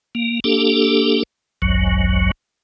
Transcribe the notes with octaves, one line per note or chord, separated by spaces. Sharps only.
A#3
A#3 D4 G4 A4
G#1 C#2 F#2 F#3